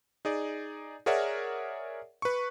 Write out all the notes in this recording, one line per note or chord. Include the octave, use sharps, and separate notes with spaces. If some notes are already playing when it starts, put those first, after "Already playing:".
D#4 G#4 D5
G#4 A#4 C#5 D5 E5 F#5
B4 C#6